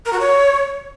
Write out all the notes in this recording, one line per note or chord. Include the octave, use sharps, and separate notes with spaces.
A#4
F#4
C#5